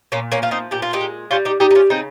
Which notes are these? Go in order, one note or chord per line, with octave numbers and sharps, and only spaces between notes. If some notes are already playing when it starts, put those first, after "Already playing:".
A#2 A#3 C#4
A#3 C#4
F3 F4
C4 D#4
A#2 G4
F4
D#4 G4
G#3
G3 C#4 F4
D#4 G4
G3 D#4 G4
D#4
C#4 F4
C#3 C4 D#4